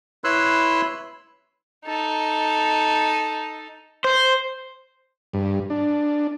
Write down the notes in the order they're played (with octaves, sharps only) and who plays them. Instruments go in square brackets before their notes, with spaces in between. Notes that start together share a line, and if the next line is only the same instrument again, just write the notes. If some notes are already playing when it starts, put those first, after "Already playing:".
[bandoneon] E4 B4 C#5 C6 E6 F#6
[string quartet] D#4 A4
[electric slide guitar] C5
[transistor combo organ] G2
D4